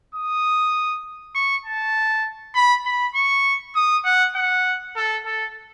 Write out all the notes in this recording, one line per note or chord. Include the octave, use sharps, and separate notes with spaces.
D#6
C#6
A5
B5
B5
C#6
D#6
F#5
F#5
A4
A4